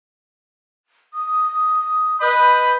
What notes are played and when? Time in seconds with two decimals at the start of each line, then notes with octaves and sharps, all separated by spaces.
1.14 D#6
2.21 B4 D#5 B5 G6